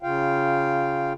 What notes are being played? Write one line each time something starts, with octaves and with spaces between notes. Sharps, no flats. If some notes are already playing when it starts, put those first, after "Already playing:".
C#3 F4 F5 G5